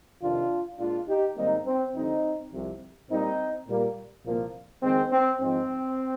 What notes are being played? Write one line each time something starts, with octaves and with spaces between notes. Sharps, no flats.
F2 C3 D#3 D4 F4
A#2 G#3 D4 F4
D#4 G4
G#2 D#3 G3 A#3 C4 D#4
C4
F2 D3 G3 C4 D#4
C2 C3 F3
A#2 G3 A#3 C4 D#4
A#2 G3 A#3
C2 A#2 F3 A#3
F2 D#3 G#3 C4
C4
G#2 F3 G#3 C4